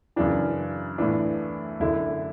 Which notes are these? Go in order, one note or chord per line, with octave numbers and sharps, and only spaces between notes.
F#2 C#3 E3 D4
A2 E3 D4
F#2 D3 E4